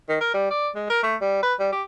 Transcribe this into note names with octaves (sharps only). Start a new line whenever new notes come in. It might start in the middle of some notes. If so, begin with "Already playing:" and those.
D#3
A#4
G3
D5
G#3
A#4
A3
G3
B4
G3
G4